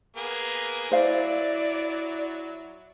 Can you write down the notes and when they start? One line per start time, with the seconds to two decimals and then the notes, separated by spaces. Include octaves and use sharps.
0.16 A#3 B3 G#4
0.92 F#3 E4 C5 D5 F5